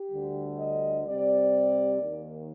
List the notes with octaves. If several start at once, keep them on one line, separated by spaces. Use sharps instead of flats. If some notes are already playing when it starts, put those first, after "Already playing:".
Already playing: G4
D2 D3 G3
D#5
C3 G3 C4 D5
D#2 D#3 A#3